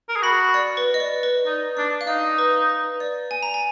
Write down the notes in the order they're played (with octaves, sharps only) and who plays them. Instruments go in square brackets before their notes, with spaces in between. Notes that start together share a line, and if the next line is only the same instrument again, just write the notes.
[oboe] A#4
G#4
[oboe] F#4 [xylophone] B5
[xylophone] D5
B4
D#5
D5
B4
[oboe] D#4 [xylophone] D5
[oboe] D4 [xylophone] D5
[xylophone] F5
[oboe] D#4 [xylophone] D#5
[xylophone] B4
B4
D5
G#5
A#5
G#5